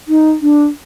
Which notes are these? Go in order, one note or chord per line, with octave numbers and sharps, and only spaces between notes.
D#4
D4